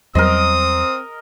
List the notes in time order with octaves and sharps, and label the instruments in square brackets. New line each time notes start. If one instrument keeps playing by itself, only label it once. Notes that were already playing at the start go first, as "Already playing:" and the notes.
[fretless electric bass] E2 F#3 G3 [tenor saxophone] C4 [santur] A#4 D#5 [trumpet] D#6